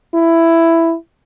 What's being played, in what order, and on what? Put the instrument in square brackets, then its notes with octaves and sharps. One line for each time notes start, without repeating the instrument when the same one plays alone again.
[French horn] E4